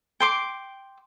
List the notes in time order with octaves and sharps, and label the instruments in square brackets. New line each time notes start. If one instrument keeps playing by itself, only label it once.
[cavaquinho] G5 C6 D6